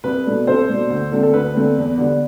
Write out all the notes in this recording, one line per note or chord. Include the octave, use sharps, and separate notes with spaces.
C2 B4
B2 A3 D4
C2 A4 C5
B2 A3 D4
D2
D3 A3 C4
A4
D2 B4
D3 A3 C4
E2
D3 G3 B3